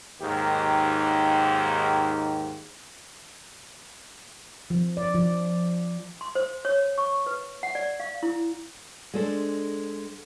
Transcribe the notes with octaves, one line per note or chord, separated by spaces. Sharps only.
D#2 G#2 D#3 G4
F3
D5
F3
C6
C5
C#5
C#6
B4
F#5
D5
F5
E4
G#3 D4 A4 C5